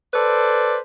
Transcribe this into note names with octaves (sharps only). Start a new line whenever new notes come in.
A4 B4 C5 D5